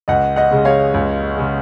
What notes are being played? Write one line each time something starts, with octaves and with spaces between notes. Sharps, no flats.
C#2 D#5 F#5
D#5 F#5
C#3 G#3
C#5 F5
C#2
C#3 G#3